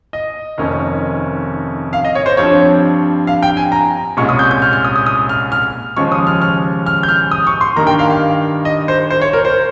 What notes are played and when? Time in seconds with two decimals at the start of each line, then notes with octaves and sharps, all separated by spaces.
0.13 D#5
0.58 F1 F2 D#3 A#3 C#4
1.93 F5
2.05 D#5
2.15 C#5
2.26 C5
2.37 G2 F3 C4 C#5
3.27 F5
3.43 G5
3.57 G#5
3.72 A#5
4.17 C2 A#2 G#3 C#4 C#6
4.29 D#6
4.39 G6
4.51 G6
4.62 F6
4.73 F6
4.85 D#6
4.96 D#6
5.06 D#6
5.29 F6
5.52 F6
5.97 D#2 C#3 F3 G#3 C#4 C#6
6.12 D#6
6.27 F6
6.42 F6
6.86 F6
7.03 G6
7.09 F6
7.31 D#6
7.47 C#6
7.61 C6
7.76 G2 D#3 A#3 A#5
7.87 G5
7.99 F5
8.10 F5
8.65 D#5
8.88 C5
9.10 C5
9.21 C#5
9.33 A#4
9.45 C5